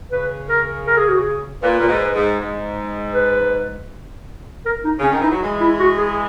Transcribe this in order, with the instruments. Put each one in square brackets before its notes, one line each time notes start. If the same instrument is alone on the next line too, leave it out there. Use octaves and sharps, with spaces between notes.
[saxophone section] C#3 [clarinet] B4
[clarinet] A#4
A#4
G#4
F#4
G#4
[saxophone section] A#2 [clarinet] B4
[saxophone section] A#2
G#2
G#2
G#2
[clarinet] B4
A#4
D#4
[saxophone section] C#3 [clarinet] C#4
[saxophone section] D#3
[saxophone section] E3 [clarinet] D#4
[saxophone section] F#3
E3 G#3
[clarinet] E4
F#4
G#4